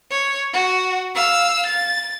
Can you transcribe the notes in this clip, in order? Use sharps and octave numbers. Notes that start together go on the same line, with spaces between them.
C#5
F#4
F5 E6
A6